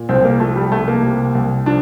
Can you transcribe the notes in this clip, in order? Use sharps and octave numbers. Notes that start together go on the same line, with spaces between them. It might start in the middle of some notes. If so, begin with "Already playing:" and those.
Already playing: A#2
C2 C4
A#3
F3 A3
G3
C2 A3
A#3
C3
C2
F3 D4